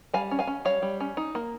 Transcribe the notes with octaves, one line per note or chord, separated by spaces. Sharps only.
G3 F5 G#5
C#4
F5 G#5
C#4
G3 C#5 F5
G3
C#4
D#4
A#3